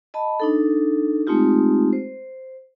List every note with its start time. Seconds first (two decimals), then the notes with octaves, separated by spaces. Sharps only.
0.14 D#5 A5 B5
0.40 D4 D#4 A4
1.27 G#3 A3 C4 D#4 F4 G4
1.93 C5